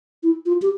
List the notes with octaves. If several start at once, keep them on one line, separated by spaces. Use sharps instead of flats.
E4
F4
G4